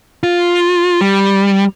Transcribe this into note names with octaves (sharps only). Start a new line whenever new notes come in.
F4
G3